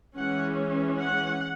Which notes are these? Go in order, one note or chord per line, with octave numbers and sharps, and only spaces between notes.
E3 G#3 C#4 F#5
F#5